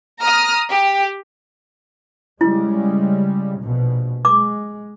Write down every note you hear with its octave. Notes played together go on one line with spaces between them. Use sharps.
A#5 D#6 F6
G4
C#3 G3 G#3 E4
A#1 B2
G#3 D6